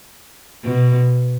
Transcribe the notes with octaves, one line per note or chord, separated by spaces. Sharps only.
B2